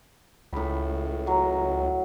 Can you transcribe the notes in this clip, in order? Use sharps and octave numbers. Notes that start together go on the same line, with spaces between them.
C#2 A2 B5
F#3